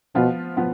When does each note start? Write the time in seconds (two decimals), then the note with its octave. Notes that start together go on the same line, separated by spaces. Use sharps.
0.15 B2 F3 B3 F4
0.56 F3 B3 F4